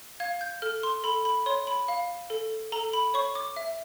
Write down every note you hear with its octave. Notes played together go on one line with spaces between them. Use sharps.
F5 G#6
G6
A4 F6
C6
A4 B5
B5
C#5 C6
B5
F5
A4
A4 A#5
B5
C#5 C#6
D6
E5